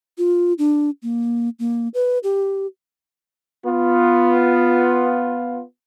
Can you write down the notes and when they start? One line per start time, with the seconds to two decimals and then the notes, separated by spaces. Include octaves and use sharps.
0.18 F4
0.59 D4
1.03 A#3
1.59 A#3
1.94 B4
2.23 G4
3.66 B3 F4